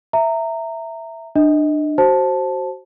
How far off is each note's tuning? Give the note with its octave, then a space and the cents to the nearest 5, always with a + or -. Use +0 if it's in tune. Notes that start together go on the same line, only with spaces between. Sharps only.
E5 +0 A#5 -20
D4 +30 D#5 +25
F#4 +25 C5 +15 A5 -5